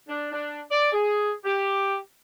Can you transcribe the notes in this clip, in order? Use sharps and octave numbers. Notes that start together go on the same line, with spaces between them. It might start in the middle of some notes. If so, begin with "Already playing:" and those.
D4
D4
D5
G#4
G4